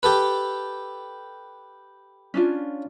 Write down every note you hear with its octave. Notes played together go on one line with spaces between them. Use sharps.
G4 A4 B4
C#4 D4 F4